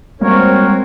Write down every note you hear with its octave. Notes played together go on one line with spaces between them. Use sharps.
G3 G#3 A#3 C4 F#4 A#4 C#5